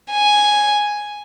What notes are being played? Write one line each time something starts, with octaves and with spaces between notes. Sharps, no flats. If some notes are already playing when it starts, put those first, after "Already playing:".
G#5